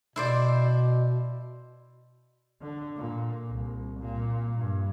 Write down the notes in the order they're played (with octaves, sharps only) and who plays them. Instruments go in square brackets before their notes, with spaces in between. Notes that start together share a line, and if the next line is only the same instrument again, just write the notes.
[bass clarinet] B2 [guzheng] E4 C5 D5
[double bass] D3
A#2
C2
A#2
G2